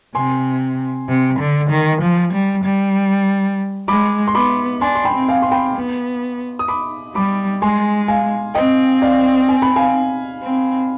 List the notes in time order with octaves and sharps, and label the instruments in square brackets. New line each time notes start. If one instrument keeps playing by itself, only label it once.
[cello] C3 [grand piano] G#5 C6
[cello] C3
D3
D#3
F3
G3
G3
[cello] G#3 [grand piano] B5 D6
[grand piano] C6
[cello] B3 [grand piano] B5 D6
[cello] D4 [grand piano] G#5 C6
[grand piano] C6
G5 B5
[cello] C4
[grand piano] F5 G#5
[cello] C4 [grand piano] C6
[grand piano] G5 B5
[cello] B3
[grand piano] D#6
B5 D6
[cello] G3 [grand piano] B5 D6
[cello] G#3 [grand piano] G#5 C6
[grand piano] F5 G#5
[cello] C4 [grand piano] D#5 G5
[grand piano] D5 F5
G#5
B5
F5 G#5
[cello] C4